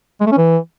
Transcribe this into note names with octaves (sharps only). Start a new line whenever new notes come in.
G#3
A3
C#4
E3